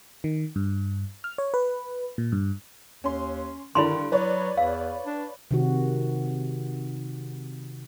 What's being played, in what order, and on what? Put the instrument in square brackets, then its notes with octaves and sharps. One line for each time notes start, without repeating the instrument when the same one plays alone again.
[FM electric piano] D#3
G2
F6
C#5
B4
A#2
G2
[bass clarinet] D#2 [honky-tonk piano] C#4 C6
[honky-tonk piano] G2 D3 D4 [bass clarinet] D#3 [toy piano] E4 B5 C6
[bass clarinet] F#3 [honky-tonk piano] B4 C#5 D5
[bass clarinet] E2 [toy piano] F5
[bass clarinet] D4
[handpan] C3 D#3 F#4